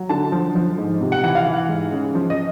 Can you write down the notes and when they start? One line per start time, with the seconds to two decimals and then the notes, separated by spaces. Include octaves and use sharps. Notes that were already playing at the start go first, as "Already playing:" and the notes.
Already playing: F#3
0.09 D3 A5
0.32 F3
0.55 F3
0.78 G#2
1.01 C3
1.12 F#5
1.24 E3 F#5
1.35 F5
1.46 E3
1.69 G#2
1.92 C#3
2.15 F3
2.30 D#5